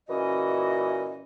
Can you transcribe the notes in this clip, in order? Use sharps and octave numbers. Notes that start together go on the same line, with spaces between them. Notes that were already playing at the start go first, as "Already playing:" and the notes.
A#2 C#3 E3 C#4 F#4 D#5